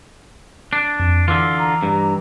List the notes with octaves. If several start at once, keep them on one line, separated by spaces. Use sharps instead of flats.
D4
F2
D3 E3 F4 D6 E6
A#5
G2